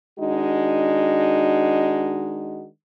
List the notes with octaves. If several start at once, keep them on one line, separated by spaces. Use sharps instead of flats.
D#3 G#3 D4 D#4 F#4